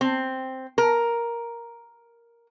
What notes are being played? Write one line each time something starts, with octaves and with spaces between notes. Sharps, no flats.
C4
A#4